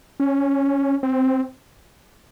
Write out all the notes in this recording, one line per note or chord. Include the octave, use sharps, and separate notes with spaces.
C#4
C4